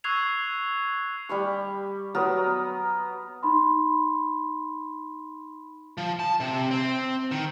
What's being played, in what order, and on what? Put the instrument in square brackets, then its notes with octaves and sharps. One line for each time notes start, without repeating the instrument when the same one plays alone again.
[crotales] C#6 E6 F#6 G#6 C7 F7
[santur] G3 B5 C#6
F#3 B3 A#4
[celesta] D#4 B5 C6
[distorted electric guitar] F3
A5
C3
C4
D#3